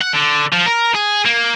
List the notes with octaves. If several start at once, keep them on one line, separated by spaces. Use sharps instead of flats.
F#5
D3
F3
A#4
G#4
A#3